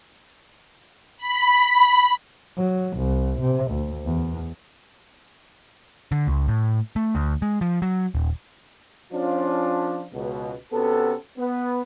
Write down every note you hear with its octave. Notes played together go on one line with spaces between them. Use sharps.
B5
F#3
C2
C3
D2
E2
D3
C#2
A2
A3
D2
G#3
F3
F#3
D#1
F3 C#4 D4 F4
C#2 B2
C3 B3 C#4 F#4 A4
B3